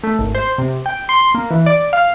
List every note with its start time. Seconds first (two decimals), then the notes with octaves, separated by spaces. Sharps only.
0.03 A3
0.19 G#1
0.35 C5
0.58 C3
0.86 G5
1.09 C6
1.34 A#3
1.50 E3
1.66 D5
1.93 F5